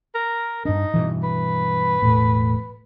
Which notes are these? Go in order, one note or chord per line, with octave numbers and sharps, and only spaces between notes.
A#4
G2 D4 D#4
G2 B2 E3
B4
E1 A2